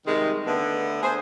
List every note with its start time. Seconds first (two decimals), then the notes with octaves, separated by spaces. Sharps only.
0.05 C3 D#3 G3 G#3
0.46 D3 A3 B3
1.03 G#4 C5